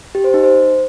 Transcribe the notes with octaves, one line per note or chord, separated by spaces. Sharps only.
G4
C5
D#4
C5